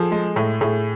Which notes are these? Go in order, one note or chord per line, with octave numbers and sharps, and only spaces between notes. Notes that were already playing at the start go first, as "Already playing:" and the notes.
Already playing: F3 G#4 A4
G#3
A2
A2 G#4